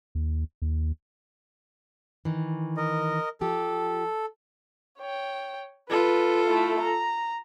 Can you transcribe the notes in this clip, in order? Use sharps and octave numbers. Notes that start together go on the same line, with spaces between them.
D#2
D#2
D#3 E3
A#4 D#5
F3 G4 A4
C#5 G5
F4 A4 B4
A3 E4
A#5